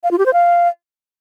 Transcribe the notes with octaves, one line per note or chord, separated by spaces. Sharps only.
F5
F4
G4
C5
F5